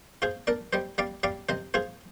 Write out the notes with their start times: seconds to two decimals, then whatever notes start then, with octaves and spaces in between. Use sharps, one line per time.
0.22 F4 G#4 C5
0.47 D4 A#4 D5
0.73 G3 C5 D#5
0.98 G3 D5 F5
1.23 G3 D5 F5
1.49 C3 C5 D#5
1.74 F4 G#4 C5